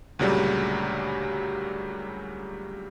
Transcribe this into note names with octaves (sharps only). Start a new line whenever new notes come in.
D2 A#2 C#3 F#3 G3